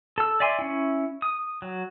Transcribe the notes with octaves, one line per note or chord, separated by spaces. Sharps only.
A4 E6
D5 E5 G#5 C6 D6
C#4 E4
D#6
F#3